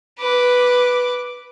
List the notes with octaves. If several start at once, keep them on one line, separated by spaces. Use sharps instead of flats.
B4 D6